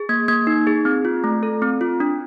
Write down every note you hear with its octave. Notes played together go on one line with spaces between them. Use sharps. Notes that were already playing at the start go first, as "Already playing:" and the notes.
Already playing: G#4
A#3 G#6
A#3 G#6
D#4
G#4
C4
F4
A3
A4
C4
F4
D4